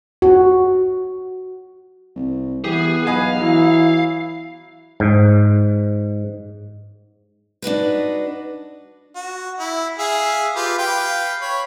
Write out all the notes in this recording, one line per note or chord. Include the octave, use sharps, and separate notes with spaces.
F#4
C2
E3 B3 G4 G#4
B1 B4 D#5 F5 G#5
E3 F#3 E4
G#2
D4 D#4 F#4 B4
F#4
E4
G#4 E5 F5
F4 G4 B4
B4 F5 G5
C#5 B5